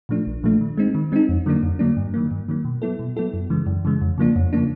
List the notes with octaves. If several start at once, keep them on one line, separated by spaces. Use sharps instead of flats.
A#2 F3 A3 D4
A#1
A#2 F3 A3 D4
D#3
G#3 C4 D#4
D#3
G#3 C4 D#4
F2
D3 F#3 A#3 D4
F2
D3 F#3 A#3 D4
G2
D#3 F#3 A#3
G2
D#3 F#3 A#3
B2
F#3 B3 E4 A4
B2
F#3 B3 E4 A4
F#2
C#3 E3 G#3
F#2
C#3 E3 G#3
F2
C#3 F3 A#3 D4
F2
C#3 F3 A#3 D4